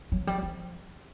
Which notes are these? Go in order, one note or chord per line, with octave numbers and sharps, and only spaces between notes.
F#3
G3
F3